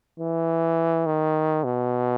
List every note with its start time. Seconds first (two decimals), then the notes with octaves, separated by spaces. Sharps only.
0.20 E3
1.06 D#3
1.64 B2